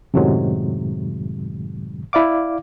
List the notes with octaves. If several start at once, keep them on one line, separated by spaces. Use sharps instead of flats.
F#2 A2 C3 D#3 F#3 G#3
E4 D5 F5 D6